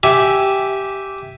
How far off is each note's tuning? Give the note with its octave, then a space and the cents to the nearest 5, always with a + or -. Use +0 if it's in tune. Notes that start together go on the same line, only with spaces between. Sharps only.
G4 -10 E5 +0 G#5 +0